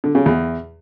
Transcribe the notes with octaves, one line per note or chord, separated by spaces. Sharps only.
D3
C#3
E2